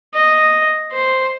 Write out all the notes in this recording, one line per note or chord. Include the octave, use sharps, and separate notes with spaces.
D#5
C5